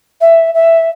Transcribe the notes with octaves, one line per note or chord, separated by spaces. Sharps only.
E5
E5